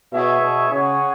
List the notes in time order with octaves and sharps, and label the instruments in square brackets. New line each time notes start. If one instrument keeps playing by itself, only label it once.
[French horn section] B2 [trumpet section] E4 G#4 C#5 E5
[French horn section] B2
[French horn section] C#3 [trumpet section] C#4 G#4 C#5 F#5